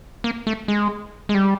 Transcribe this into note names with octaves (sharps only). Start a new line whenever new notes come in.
A#3
A3
G#3
G#3
G3